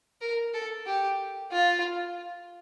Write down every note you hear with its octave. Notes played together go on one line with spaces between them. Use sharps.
A#4
A4
G4
F4